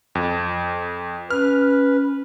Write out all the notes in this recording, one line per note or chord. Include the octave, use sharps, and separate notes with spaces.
F2
C#4 B4 F6